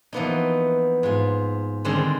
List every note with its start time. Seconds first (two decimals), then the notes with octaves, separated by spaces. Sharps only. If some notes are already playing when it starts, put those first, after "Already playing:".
0.13 E3 F3 A#3 B3 D4 D#4
1.03 G#2 F4
1.85 D3 D#3 G3 G#3 C4 A4